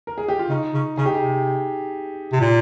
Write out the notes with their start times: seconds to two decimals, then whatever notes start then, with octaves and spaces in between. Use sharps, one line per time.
0.07 A#4
0.18 G#4
0.28 G4
0.39 F4
0.49 C#3 D#4
0.74 C#3
0.97 C#3 G#4
1.05 G4
1.14 G#4
1.21 C3
2.32 C3
2.40 A#2